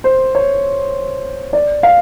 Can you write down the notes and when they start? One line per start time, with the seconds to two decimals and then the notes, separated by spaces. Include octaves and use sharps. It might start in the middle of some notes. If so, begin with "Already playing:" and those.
0.04 C5
0.35 C#5
1.53 D5
1.83 F5